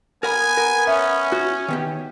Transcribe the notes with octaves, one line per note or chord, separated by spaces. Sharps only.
B3 A#4 F#5 G#5 B5
A#4
C#4 E5
F#4
D#3 B3 G4